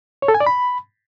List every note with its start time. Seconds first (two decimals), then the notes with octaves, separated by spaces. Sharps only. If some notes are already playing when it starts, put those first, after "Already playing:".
0.22 C#5
0.28 A4
0.34 G#5
0.40 D5
0.46 B5